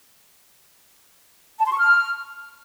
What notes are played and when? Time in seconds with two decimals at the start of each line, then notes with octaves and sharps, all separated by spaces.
1.60 A5
1.66 C6
1.72 C#6
1.79 F6